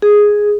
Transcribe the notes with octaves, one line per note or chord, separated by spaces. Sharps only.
G#4